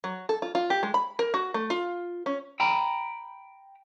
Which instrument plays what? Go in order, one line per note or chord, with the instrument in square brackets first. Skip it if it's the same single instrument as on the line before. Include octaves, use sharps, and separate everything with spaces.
[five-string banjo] F#3
A4
F4
F4
G4
G#3
B5
A#4
F#4
A3
F4
C#4
[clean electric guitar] G5 A#5 B5